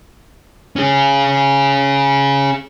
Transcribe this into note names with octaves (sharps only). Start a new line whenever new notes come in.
C#4 G#4